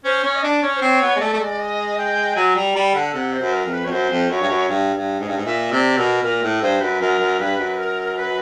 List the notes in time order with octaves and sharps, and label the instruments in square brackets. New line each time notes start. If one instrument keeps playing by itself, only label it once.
[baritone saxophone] C#4 [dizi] C5
[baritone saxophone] C#4 [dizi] C#5
[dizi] D#5
[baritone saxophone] D4 [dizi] D5
[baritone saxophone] C#4 [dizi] C#5
[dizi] C5
[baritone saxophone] C4 [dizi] C#5
[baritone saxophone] B3
G#3
[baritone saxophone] A3 [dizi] D5
[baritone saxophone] A3
G#3
[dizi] D#5
G5
[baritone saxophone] F#3 [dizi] G#5
[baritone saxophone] G3 [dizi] A#5
[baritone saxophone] G3 [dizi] B5
[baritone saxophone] D3 [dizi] F#5
[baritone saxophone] C3 [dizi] F#5
[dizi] C5
[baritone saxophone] F#2
[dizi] A#4
[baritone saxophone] F2
[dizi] B4
[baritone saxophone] F2 [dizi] C#5
[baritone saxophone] F#2 [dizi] C5
[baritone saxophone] F2
[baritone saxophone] F#2 [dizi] C#5
[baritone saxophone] G2
F#2
G2
G2
G#2
G2
G#2
[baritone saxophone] A#2 [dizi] E5
[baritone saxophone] C3 [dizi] D5
[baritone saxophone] B2 [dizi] A#4
[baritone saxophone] A#2 [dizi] A#4
[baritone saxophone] A2
[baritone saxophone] G2 [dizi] C5
[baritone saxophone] F#2 [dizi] B4
[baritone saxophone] F#2 [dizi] A#4
[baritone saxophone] F#2
[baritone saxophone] G2 [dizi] B4
[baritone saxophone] F#2
[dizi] A#4
B4